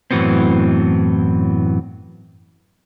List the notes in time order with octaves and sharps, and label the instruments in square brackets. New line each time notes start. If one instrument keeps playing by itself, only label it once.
[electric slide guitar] F#2 A2 E3 F#3 B3 C4